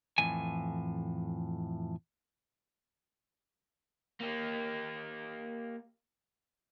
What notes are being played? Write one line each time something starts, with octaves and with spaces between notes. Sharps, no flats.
F2 A2 E3 G#5
A#3 G4